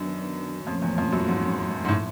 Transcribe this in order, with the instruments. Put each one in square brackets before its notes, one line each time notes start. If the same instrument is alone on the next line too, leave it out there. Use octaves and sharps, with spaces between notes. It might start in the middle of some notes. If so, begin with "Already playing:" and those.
Already playing: [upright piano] F#2 [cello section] D#3 F#3 B3 D4
[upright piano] F2 [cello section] A#2 F3 A3 C#4
[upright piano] E2
F2
F#2
G#2
G#2
A2